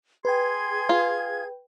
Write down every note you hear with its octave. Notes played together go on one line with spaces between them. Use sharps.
G#4 B4 G5 C6 G#6
F4